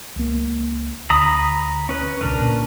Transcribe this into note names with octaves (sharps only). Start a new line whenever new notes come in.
C#2 A#3
D2 A#5 B5 D#6
C#4 B4
E1 C#2 D4 A#4 B4
A#2